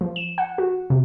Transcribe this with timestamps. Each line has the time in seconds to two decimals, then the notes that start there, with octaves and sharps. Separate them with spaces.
0.01 F3
0.16 E7
0.38 F#5
0.58 F#4
0.90 C3